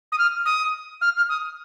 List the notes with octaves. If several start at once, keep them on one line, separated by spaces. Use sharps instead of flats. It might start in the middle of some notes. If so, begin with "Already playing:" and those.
D#6
F6
D#6
F6
F6
D#6